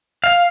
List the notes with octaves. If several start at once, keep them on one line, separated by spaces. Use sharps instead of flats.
F5